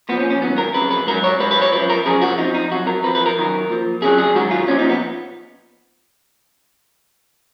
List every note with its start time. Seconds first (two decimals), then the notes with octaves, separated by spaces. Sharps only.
0.09 A#2 F3 B3
0.20 C#4
0.30 C#4
0.41 G#2 D#3 F#3 B3
0.58 A#4
0.74 F2 C#3 F#3 B4
0.91 B4
1.07 G#2 F#3 A#4
1.24 C#5
1.40 G#2 F#3 B4
1.51 B4
1.62 C#5
1.72 F#2 F3 B4
1.90 A#4
2.06 F#2 C#3 F3 G#4
2.21 F#4
2.38 F2 F3 D#4
2.54 D#4
2.70 F2 D#3 F#3 F#4
2.87 A#4
3.03 F2 F3 B4
3.15 B4
3.26 A#4
3.36 F#2 D#3 F#3
3.69 A#2 F3
4.02 F2 C#3 F#3 G#4
4.18 G#4
4.34 G#2 D#3 F#3 F#4
4.51 F4
4.68 A#2 C#4
4.71 F3
4.79 D#4
4.90 B3